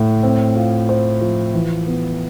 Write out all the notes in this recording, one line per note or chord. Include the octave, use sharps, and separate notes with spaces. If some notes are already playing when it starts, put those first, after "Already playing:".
Already playing: A2
C4
F4
C5
F3
E3
B3